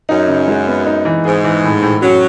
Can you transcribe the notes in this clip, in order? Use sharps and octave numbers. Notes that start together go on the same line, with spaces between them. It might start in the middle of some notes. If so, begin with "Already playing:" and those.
F#2 D#4
C#3
G#3
B3
D#4
E3
G#2 G#4
E3
A2
A2
F#3 C#4